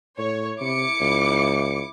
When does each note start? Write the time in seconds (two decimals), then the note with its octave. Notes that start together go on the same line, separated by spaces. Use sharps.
0.18 A2 C#5
0.61 C3 E4 D6 C#7
1.01 C#2